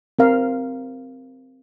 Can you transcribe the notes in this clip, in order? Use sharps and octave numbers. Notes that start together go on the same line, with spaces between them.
C4 A#4 F5